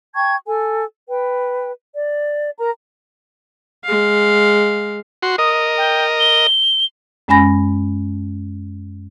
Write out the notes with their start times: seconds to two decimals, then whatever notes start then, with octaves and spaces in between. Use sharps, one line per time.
0.15 G5 A5 C#6 G#6
0.46 A4 G#5
1.09 B4 G5
1.94 D5
2.58 A#4 A#5
3.85 G#3 F5
5.23 F#4 C6
5.38 A#4 D#5 D#6
5.78 G5
6.20 G7
7.28 F#2 G#3 C#4 G#5 B5 A#6